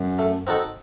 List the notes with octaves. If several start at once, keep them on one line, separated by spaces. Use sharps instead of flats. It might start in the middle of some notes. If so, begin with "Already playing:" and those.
Already playing: F#2
A3
C4 D#4 F#4 A4